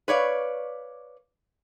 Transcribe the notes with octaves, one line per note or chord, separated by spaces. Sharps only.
B4 C#5 D5 F5